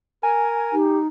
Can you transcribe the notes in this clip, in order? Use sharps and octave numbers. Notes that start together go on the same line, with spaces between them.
A#4 G#5
D#4 G4